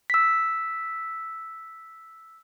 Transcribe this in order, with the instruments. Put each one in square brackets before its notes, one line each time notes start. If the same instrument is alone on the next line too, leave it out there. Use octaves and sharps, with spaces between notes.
[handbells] E6 B6